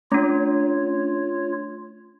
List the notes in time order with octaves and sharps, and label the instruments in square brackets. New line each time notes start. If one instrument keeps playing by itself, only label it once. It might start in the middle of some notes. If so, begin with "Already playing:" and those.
[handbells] A3 D4 [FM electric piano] C#4 [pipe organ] F4 C#5